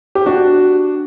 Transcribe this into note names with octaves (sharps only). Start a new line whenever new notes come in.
G4
D4 F#4